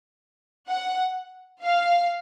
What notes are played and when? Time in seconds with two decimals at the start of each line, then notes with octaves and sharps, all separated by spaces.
0.69 F#5
1.64 F5